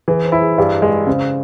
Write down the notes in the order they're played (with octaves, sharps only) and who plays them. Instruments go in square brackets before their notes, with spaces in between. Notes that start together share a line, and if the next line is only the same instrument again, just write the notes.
[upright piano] E3 [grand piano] G#4
[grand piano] C5
[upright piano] E4
[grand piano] G#4
[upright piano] G2 [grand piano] G4
[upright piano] G#3
[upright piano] C#3 [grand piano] C5